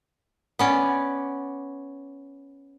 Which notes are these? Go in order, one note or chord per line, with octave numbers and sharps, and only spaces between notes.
B3 C#4 D5